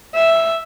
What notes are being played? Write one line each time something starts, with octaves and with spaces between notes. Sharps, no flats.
E5